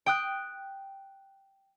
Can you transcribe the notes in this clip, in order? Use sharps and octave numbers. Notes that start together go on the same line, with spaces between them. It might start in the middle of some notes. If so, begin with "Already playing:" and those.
G5 D#6 F#6